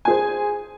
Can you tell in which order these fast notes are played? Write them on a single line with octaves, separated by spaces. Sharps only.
G#5 G#4 C5